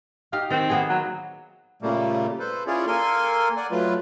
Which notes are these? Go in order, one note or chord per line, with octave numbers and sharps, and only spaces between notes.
D#4 G4 F5
D#3 C4
A#3 B3 G#4
F#3
A#2 C#3 G3 A3 A#3
A4 B4 C5
C#4 E4 F4 G#4 C#5 D5
A#3 A4 A#4 G#5 C6
D5 F#5 G#5
F#3 A3 F4 B4